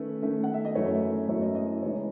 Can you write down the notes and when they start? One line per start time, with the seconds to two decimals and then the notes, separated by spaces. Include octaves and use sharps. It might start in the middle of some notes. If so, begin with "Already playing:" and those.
Already playing: D#3 A3 C#4 B4
0.22 D#3 A3 C#4
0.43 F#5
0.54 E5
0.65 D#5
0.75 F#2 E3 A3 E4 C#5
1.28 F#2 E3 A3 E4 C#5
1.42 D#5
1.55 D#5
1.69 D#5
1.82 C#3 E3 G#3 D#4 C#5